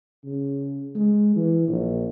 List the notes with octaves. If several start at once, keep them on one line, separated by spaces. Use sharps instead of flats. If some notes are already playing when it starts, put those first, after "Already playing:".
C#3
G#3
E3
A#1